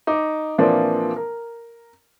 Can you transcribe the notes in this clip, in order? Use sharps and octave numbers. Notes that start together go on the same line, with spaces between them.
D#4 D6
A#2 E3 F3 A#3 C4 D4
A#4